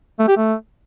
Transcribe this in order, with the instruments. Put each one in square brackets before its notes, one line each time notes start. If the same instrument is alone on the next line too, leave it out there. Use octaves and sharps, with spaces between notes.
[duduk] A3
G4
A3